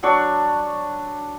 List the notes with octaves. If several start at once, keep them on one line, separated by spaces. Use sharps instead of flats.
F#3 D4 C#6